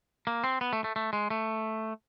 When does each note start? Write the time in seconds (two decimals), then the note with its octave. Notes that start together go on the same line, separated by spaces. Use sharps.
0.27 A#3
0.44 C4
0.61 B3
0.73 A3
0.84 A3
0.96 A3
1.13 G#3
1.30 A3